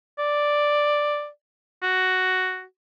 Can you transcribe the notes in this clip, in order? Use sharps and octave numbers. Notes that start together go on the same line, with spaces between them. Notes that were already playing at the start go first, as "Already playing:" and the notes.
D5
F#4